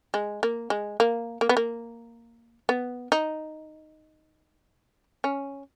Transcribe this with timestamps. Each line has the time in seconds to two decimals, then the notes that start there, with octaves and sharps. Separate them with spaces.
0.14 G#3
0.43 A#3
0.70 G#3
1.00 A#3
1.41 A#3
1.49 B3
1.57 A#3
2.69 B3
3.12 D#4
5.24 C#4